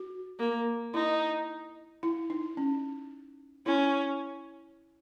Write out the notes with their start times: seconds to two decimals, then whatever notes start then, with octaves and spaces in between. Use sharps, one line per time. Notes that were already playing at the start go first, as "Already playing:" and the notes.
Already playing: F#4
0.39 A#3
0.94 D#4 E4
2.03 E4
2.30 D#4
2.57 C#4
3.66 C#4 E4